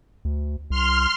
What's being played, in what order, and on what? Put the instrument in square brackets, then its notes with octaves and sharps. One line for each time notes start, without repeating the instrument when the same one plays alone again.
[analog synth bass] D2
[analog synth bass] C2 [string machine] C6 F6